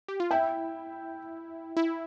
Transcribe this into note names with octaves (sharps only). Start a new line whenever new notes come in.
G4
F4
E4 E5 G5
E4